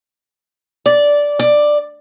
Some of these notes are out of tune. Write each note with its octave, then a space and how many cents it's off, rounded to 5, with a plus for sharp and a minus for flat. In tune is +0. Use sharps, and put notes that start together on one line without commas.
D5 -10
D5 +10